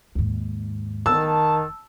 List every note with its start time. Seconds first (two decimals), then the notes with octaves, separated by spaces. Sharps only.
0.15 D#2 G#2
1.06 F1 D#3 A5 E6